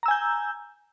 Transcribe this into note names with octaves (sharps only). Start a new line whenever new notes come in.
G#5 A#5 E6 G6